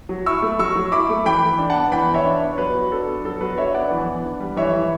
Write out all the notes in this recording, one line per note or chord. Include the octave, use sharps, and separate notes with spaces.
F#3
E4 C#6 E6
A3
F#3 C#6 E6
F#3
E4 B5 D6
A3
E3 G5 B5
E3
D4
F#5 A5
B3
E3 G5 B5
E3
C#5 E5
D4
B3
C#5
F#3 B4
F#3
D4 A4
B3
F#3 A4
F#3 B4
D4 C#5 E5
B3 D5 F#5
E3
E3
D4
G3
E3 C#5 E5
E3